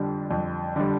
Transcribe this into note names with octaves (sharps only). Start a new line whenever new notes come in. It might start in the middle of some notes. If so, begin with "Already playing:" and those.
Already playing: F2 D3 G3
F2
D3 G3